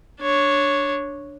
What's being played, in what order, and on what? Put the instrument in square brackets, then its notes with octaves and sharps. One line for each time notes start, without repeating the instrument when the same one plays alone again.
[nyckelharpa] D4 C#5